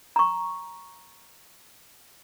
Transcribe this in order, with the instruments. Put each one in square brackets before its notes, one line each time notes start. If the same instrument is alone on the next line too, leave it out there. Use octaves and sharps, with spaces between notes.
[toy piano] A#5 C#6